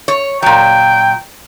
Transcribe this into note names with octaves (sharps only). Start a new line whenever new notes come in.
C#5
A#2 F#3 G5